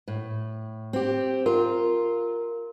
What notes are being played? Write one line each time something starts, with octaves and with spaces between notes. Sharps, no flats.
A2
C4 G4
F4 A#4